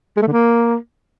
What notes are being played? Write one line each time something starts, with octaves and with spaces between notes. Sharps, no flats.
G#3
A3
D3
A#3